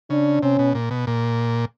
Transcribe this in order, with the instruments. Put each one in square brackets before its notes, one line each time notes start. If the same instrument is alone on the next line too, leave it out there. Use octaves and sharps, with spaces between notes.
[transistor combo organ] C#3 [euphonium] D4
[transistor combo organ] C3 [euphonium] C#4
[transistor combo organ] B2
A#2
B2
A#2